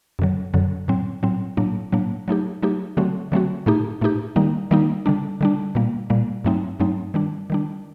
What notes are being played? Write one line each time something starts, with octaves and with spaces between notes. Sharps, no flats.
F#2 D3 F#3
F#2 D3 F#3
A2 F#3 C4
A2 F#3 C4
A2 F#3 A#3 D4
A2 F#3 A#3 D4
F#3 A3 D#4 G4
F#3 A3 D#4 G4
D3 F#3 A3 C4 F#4
D3 F#3 A3 C4 F#4
A2 A3 D#4 G4
A2 A3 D#4 G4
D#3 G3 A#3 D#4
D#3 G3 A#3 D#4
D3 G3 D4
D3 G3 D4
A#2 G3 A#3
A#2 G3 A#3
G2 F#3 A3 C4 D#4
G2 F#3 A3 C4 D#4
D#3 G3 D4
D#3 G3 D4